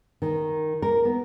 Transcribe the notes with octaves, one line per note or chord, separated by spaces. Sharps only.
D#3
A#4
B3